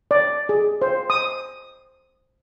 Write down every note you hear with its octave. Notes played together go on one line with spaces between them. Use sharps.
D5
G#4
C5
D#6